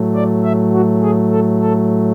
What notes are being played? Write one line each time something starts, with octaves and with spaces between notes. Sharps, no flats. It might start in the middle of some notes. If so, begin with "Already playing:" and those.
Already playing: A2 F#3 A3
D5
E5
F#4
G#4
A4
A4